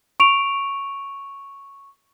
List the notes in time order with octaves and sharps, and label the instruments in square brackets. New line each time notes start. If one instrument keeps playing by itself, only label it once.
[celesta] C#6 D7 F7